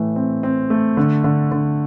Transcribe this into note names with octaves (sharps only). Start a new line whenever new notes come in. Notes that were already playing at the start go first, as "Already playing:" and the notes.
Already playing: A2 E3 A3
C4
C4
A3
D3
D3
D3